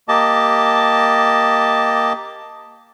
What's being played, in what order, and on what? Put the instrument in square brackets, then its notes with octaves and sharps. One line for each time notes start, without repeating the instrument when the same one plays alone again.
[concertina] A#3 G4 D#5 A5